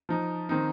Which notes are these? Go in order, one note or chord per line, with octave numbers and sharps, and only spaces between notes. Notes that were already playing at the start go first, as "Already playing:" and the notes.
F3 D#4
D#3 C4 D#4